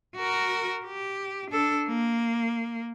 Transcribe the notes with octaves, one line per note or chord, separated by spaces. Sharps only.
F#4 A#4
G4
D4 A4
A#3